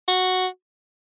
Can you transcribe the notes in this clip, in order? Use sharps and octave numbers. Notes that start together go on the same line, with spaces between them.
F#4